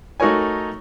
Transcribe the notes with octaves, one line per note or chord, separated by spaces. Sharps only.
A3 D#4 F#4 A#4 C#5 G#5